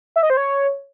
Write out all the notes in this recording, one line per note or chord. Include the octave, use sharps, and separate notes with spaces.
E5
D#5
C5
C#5